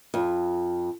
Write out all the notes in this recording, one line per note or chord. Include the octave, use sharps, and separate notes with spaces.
F2